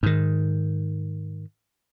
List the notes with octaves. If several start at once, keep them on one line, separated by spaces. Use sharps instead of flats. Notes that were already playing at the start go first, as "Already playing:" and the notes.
G#2 D#3